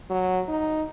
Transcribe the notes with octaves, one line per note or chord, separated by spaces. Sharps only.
F#3
D#4